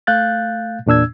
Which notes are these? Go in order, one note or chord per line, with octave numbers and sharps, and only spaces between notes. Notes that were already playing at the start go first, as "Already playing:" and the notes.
A3 F5 F#6 G6 A6
E2 A#2 D4 E6 G#6